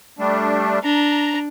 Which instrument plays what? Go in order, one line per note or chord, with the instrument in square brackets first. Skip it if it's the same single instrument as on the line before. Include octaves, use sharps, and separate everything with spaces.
[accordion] G3 A3 D4
[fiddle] D4 [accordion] A#5